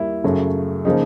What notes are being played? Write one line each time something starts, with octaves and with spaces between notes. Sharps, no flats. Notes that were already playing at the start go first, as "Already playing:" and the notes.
Already playing: D#2 G3 A#3 E4
F#2 C#3 F#3 A3
C#3 F3 A#3 D#4